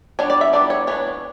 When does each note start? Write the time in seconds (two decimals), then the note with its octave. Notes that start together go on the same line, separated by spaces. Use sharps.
0.19 G3 B3 D4 C#5
0.30 D5
0.41 E5
0.53 G3 B3 D4 D5
0.70 C#5
0.87 E3 B3 D4 C#5